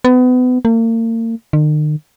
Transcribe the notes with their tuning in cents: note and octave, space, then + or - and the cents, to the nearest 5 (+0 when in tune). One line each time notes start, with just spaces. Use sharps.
B3 +30
A#3 -40
D#3 -45